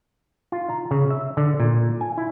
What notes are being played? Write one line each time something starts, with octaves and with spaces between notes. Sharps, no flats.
F4
A#5
C#3
E5
D3
A#2
G#5
E4